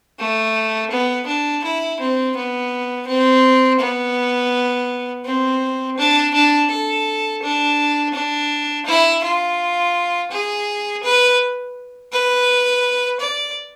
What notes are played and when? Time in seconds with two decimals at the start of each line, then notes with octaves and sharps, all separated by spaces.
0.19 A3
0.91 B3
1.27 D4
1.64 E4
2.00 C4
2.36 B3
3.07 C4
3.80 B3
5.25 C4
5.97 D4
6.34 D4
6.70 A4
7.43 D4
8.14 D4
8.86 E4
9.23 F4
10.31 G#4
11.03 B4
12.12 B4
13.20 D5